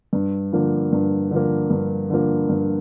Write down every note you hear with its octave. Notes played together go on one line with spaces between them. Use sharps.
G2
D3 F3 A#3
G2
D3 F3 A#3
G2
D3 F3 A#3
G2